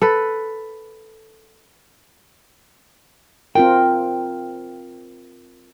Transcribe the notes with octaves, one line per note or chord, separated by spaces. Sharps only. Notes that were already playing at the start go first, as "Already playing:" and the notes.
A4 B4
C4 F4 A#4 G5